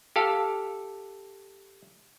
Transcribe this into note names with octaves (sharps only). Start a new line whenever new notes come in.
G4 A4 F5